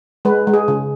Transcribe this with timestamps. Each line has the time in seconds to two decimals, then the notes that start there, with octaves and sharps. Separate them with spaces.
0.25 G#3 B4
0.47 G#3
0.54 G#4
0.68 C#3